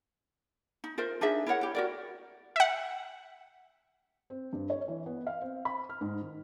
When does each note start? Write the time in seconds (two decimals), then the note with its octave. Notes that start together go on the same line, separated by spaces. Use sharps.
0.84 D#4
0.98 F4 A#4 C5 E5
1.21 D4 D#4 G#4 E5
1.46 E4 A#4 C#5 F#5
1.61 E4 G4
1.75 F#4 A#4 D5
2.56 E5 F#5
4.30 C4
4.53 G2
4.70 C#5
4.88 E3
5.06 B3
5.27 F5
5.41 C4
5.65 B5
5.89 F6
6.01 G#2
6.22 D#3